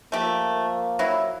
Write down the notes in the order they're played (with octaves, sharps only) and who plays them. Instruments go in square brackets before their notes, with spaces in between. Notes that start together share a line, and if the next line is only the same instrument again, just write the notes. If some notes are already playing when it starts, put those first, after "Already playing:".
[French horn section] F3 A#3 [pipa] A3 G4
[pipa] F#3 E4